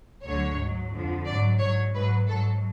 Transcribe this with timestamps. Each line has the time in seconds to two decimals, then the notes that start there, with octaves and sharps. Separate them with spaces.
0.23 D2 D3 F#3 C#5
0.58 G#2 F#3
0.92 F2 D3 F3
1.25 G#2 F#3 D5
1.59 G#2 F#3 C#5
1.93 G#2 F#3 B4
2.27 G#2 F#3 A4